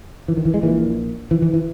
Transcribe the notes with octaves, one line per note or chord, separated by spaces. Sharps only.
E3
D#3
E3
G#3
A#1 A#2 E3
E3
E3
E3